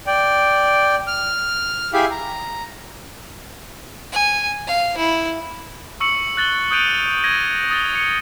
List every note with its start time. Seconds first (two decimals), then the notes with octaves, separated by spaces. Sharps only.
0.07 D5 G5
1.07 F6
1.93 E4 G4 G#4 E5 F5
2.11 A#5
4.12 G#5
4.67 F5
4.97 E4
6.00 C#6 E6 C#7 F#7
6.37 F#6 A6 F#7 G7
6.71 D#6 F#6 G6 D7 D#7 F7
7.24 G#6 A#6 D#7
7.70 D#6 A6 G7
7.95 C#7